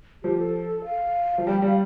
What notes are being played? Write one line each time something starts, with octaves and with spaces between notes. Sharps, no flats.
F3 G4
A4
F5
F3
G3 G5
G3
F5